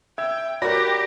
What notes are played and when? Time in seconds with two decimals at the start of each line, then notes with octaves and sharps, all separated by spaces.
0.18 E5 G5 E6 G#6
0.62 F#4 G4 A#4 C#5 D5 B5 A#6